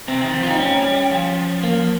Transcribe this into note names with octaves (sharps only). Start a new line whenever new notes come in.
C3 C4
D#3
F3
F4
G3 D#4
C#4
F3
A#3